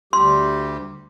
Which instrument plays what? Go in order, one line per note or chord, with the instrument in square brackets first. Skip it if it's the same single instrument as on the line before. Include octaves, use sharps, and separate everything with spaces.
[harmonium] D2 G3 G4 [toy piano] C6